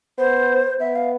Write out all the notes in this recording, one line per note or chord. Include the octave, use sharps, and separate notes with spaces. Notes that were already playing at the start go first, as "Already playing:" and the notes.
B3 C5
B3 E5
F5